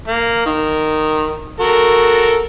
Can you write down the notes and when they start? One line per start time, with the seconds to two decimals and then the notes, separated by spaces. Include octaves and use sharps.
0.08 A#3
0.46 D#3
1.60 F#4 A4 A#4